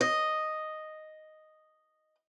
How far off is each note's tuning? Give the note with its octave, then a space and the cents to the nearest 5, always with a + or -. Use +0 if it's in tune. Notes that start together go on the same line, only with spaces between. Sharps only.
D#5 -5